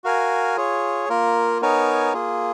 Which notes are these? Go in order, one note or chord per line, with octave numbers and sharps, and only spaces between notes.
F#4 A#4 F5 G#5
F4 G#4 C#5
A#3 F4 A#4
B3 D#4 A#4 C#5 G#5
A#3 F4 G#4